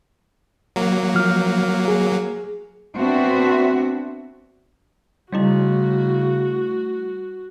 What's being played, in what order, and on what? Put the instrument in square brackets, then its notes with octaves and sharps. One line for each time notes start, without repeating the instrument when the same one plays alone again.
[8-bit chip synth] F#3 A#3
[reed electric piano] F3 F6
G#4
[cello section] B3 C4 D4 F#4 E5
[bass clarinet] C#3 [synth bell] G3 A3 E4 [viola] F#4